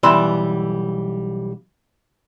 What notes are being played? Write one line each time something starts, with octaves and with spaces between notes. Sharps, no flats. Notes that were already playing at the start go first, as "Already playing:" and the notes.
B1 E3 G3 E5 B5 C6